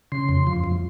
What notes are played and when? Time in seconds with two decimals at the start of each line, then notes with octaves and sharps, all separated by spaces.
0.12 C#3 C6
0.29 F2
0.47 F3
0.64 F2